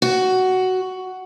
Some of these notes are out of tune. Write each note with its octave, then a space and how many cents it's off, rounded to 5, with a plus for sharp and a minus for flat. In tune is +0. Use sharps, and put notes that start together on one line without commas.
F#4 +10